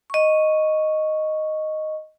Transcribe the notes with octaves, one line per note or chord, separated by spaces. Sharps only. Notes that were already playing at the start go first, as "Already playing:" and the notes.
D#5 C#6